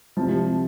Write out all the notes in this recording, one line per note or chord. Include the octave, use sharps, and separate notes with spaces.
C2 C3 F3 A5